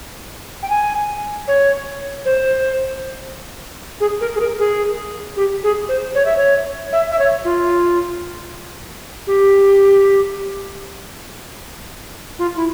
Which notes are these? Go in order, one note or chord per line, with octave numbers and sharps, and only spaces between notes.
G5
G#5
C#5
C5
G#4
A#4
G#4
A#4
G#4
G4
G#4
C5
C#5
E5
C#5
E5
E5
C#5
F4
G4
F4
E4